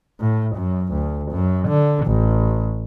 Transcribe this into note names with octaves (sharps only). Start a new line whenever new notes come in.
A2
F#2
D2
F#2
D3
A1